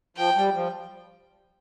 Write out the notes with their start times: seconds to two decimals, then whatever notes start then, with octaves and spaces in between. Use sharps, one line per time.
0.17 F3 G5
0.36 G3
0.55 F3